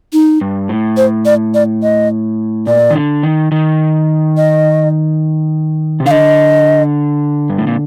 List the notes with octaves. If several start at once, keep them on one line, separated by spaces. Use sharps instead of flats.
D#4
G2
A2
C5
D5
D5
D#5
A#2 D5
D#3
D3
D#3
D#3
D#5
C3
D3 F5
D#5
G2
A2
A#2